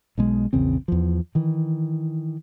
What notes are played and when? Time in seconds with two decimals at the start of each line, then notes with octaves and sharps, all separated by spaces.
0.18 B1 B2 G#3
0.53 A#1 E2 C#3 C4
0.88 E2 F3
1.35 D#3 E3